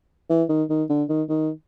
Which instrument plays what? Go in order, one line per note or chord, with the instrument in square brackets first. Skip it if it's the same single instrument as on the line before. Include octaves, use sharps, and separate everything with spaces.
[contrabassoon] E3
D#3
D#3
D3
D#3
D#3